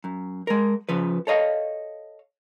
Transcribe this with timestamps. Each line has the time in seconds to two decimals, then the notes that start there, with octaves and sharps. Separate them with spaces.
0.04 F#2
0.47 G#3 A#4
0.89 C#3 F3 B4
1.27 A4 C#5 D#5 F5